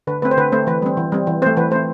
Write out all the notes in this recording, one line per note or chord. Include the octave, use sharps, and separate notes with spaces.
D3 B4
A3 C4 B4
C5
D3 B4
A3 C4 C5
E3 B4
G3 C4
E3
G3 C4
E3
A3 C4 C5
E3 B4
A3 C4 C5